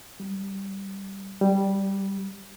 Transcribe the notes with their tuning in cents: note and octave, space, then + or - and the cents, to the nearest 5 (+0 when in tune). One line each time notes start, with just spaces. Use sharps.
G3 -5
G3 -5